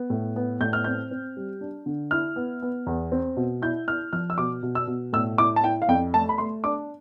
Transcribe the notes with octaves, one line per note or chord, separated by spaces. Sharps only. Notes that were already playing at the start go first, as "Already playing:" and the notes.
Already playing: B3
A2
B3
A2 G6
F6
C4 G6
C4
G3
D4
D3
E4 F6
B3
B3
E2
C4
B2
E4 G6
E4 F6
F3 F6
E6
B2 D6
B2
E6
B2
A2 E6
E4 D6
A5
E4 G5
F5
F2 G5
A3 A5
B5
A3 C6
D4 D6